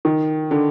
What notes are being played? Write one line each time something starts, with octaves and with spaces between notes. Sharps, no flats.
D#3
D3